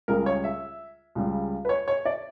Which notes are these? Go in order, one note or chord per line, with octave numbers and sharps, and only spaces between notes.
C#2 C#3 G3 A#4
C#5
E5
C#2 C#3 G3
B4
C#5
C#5
D5